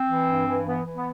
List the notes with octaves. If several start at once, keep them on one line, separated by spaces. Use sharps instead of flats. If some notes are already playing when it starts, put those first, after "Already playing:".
Already playing: C4
E3
G2
E3
E3 B3
E3
B3